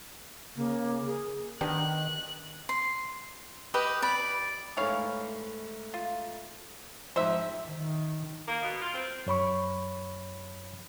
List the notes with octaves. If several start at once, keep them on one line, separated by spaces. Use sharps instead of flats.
C#3 A#3
G#4 A#4
D#3 B3 D4 G4 F#6
C6
G4 B4 D#5
D5 B5
G#2 E3 A3 C#5 F5
F4
F2 G#2 C5 E5
D#3
A#3
B2
F4
C4
F#2 C#5 B5 C#6